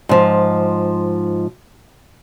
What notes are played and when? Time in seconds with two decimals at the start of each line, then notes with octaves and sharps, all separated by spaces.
0.09 G#2 F3